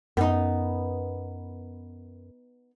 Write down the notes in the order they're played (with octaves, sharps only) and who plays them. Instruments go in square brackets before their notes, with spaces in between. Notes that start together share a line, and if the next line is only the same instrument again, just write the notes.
[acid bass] F#2 [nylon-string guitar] B3 D#4